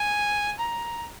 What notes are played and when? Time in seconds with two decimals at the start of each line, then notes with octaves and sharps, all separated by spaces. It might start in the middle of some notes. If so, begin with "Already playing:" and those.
Already playing: G#5
0.59 A#5